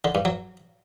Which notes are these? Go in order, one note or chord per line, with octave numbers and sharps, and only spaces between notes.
D3
G2
F#3